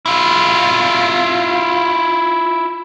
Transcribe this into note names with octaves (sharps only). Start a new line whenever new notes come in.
E4 F4